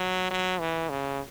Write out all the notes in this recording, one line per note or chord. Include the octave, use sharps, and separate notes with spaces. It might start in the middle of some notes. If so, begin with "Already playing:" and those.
Already playing: F#3
F#3
E3
C#3